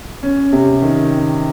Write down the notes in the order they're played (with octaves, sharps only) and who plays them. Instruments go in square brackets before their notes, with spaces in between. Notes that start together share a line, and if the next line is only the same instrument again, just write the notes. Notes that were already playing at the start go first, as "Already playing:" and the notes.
[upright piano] C#4
C3
D#3